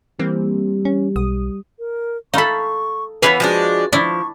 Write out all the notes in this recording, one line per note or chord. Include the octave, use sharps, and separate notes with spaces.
E3 G3 A#3 C4
C#4
B1 D#6
A#4
D#4 A4 F5 B5 C#6
E3 G3 B3 B4 C#5 F5 G#5 B5
F3 G#3 D4 F#4
F3 D4 E4 C#6